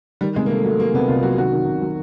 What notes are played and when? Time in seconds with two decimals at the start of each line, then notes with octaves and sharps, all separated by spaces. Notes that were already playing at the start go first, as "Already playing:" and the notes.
0.21 D#3 G3
0.36 C3 G#3
0.46 A#3
0.50 C3 A3
0.64 F#3 A3
0.80 F#3 A#3
0.94 C3 B3
1.08 C2 F4
1.23 F#3 F#4
1.38 D#3 F#4
1.52 D#3
1.67 C3
1.82 F#3